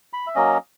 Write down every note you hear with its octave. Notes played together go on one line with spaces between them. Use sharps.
B5
E5
F#3 A#3 C#4 D#5